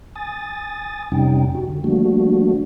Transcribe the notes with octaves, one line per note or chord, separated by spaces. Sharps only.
G#5 D#6 A6
F2 C3 G3 C#4 D#4 G5
F#4
D3
F3 G3 A3 A#3 D4 F#4